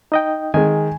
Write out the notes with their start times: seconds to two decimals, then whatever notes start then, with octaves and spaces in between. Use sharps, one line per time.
0.12 D#4 D#5 G5
0.54 D#3 G#3 G#5